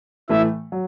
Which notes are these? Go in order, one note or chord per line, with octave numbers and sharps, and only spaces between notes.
A2 E3 A3 E4 E5
F#3